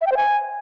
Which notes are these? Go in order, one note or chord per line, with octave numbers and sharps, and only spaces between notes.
E5
G5
C5
G#5